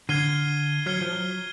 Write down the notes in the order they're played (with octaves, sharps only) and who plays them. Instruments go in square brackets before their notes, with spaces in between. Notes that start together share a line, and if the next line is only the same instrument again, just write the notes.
[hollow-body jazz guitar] D3 [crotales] F6 G#6 C7 D#7 G7
[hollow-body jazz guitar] F#3 [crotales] F6 G#6 C7 D#7 G7
[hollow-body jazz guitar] F3
F#3